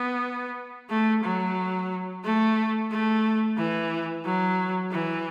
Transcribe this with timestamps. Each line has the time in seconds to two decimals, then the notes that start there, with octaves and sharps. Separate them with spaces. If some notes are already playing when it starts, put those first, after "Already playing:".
Already playing: B3
0.90 A3
1.24 F#3
2.23 A3
2.91 A3
3.57 E3
4.25 F#3
4.91 E3